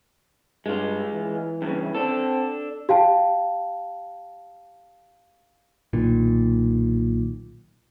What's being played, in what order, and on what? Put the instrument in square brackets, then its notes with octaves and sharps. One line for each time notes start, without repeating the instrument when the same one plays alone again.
[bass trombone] G2 [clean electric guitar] G#3 F4
[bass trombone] E3
[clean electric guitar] G2 A#2 C#3
[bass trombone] C4 [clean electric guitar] D4 A4
[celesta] G4 F5 G5 A5
[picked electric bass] B1 A#2 D#3